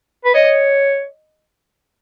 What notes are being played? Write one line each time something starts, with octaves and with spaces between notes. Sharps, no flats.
B4
C#5 D#5